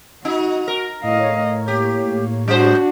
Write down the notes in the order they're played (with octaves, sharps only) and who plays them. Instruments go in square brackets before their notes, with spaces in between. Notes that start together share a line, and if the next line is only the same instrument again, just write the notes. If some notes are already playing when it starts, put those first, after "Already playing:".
[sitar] D#4 [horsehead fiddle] F#4
[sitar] A#4
[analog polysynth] A2 C#5 [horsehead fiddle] D#5 F5
[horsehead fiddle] A#3 [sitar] G4
[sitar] G3 C5 [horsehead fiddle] D4 F#4